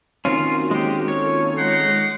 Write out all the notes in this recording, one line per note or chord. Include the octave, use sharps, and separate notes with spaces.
D#3 A#3 C4 C#4 F4 F#4
G#3 G4
F4 A4 C#5
G#3 D#4 F#5 C6 D6